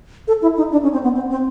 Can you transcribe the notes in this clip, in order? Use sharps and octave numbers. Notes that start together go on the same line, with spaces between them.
A4
E4
D#4
D4
C#4
C4
B3
C4
C4